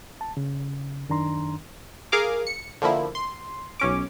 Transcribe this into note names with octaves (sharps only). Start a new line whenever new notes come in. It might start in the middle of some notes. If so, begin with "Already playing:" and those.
A5
C#3
F#2 D#3 D4 A#5 C6
G#4 A#4 F5 D6
C#7
D3 F3 A#3 E4
C6
B1 C#4 D6